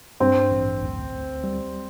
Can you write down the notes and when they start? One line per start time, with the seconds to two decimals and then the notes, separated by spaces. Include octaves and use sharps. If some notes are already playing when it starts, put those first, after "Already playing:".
0.20 G2 C4
0.51 A1
0.82 D2
1.12 D2
1.44 G3